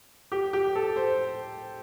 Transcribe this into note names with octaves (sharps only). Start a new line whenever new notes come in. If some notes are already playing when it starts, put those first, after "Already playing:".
G4
G4
A4
C5